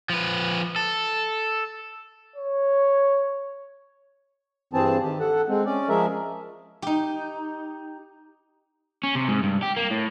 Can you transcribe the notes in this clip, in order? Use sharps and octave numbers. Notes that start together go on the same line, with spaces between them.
F3 B4
A4
C#5
G2 E3 C4 G#4 A5
D#3 G4
A4 F#5
G#3 C4
C#4 D5
F3 G#3 G#4 A#4 E5
D#4 G4
C#4
C3
G#2
G2
G4
A#3
A2